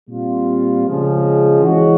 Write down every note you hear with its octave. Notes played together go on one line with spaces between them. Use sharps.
A#2 G3 C4 F4
C#3 F3 G#3
E3 G#3 C#4 F#4